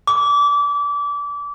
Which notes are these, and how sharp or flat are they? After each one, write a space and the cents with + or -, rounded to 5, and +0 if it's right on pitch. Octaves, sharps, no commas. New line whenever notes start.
D6 -25